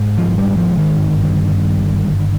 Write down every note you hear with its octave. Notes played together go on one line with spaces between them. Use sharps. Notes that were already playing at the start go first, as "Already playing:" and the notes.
Already playing: G#2
G#1 F3
F3
G3
G#1
F3
G#2
D#3
G1
G2
G2
G1
G1